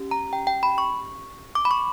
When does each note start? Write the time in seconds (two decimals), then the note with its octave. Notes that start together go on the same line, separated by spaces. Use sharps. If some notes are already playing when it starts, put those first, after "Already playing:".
Already playing: C#4 G4
0.11 A#5
0.33 G5
0.47 G5
0.63 B5
0.78 C#6
1.55 D6
1.65 B5
1.71 C#6